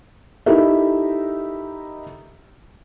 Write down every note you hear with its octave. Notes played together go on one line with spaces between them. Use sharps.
D#4 E4 G4 A4 A#4 E5